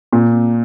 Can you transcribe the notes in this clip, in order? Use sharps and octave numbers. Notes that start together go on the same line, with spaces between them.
A#2